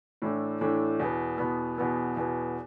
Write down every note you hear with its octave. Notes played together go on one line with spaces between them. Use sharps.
A2 E3 A3 D4
A2 E3 A3 D4
E2 B2 B3
E2 B2 B3
E2 B2 B3
E2 B2 B3